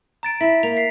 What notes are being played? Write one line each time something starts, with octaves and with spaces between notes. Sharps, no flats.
A#5 A6 D7
E4 B6
A#3 F7
B6 C7